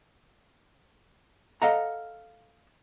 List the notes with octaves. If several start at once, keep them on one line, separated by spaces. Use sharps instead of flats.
A4 D#5 F5 F#5 A#5